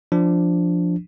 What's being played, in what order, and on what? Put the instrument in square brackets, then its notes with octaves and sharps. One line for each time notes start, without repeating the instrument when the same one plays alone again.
[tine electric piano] F3 D4